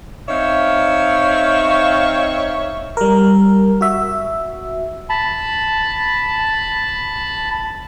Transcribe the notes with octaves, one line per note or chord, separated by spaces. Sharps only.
C4 D#4 C#5 E5 F5
G3 A#4
F#4 E5
A5 B5